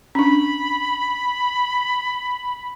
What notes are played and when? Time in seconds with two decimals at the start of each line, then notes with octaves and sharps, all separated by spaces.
0.15 C#4 D4 B5